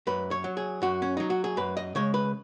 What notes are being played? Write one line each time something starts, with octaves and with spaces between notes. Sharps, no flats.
F#2 B4
C#5
F#3
G#4
F#2 F#4
C#4
F#3 D#4
F#4
G#4
F#2 B4
D#5
C#3 G#3 C#5
B4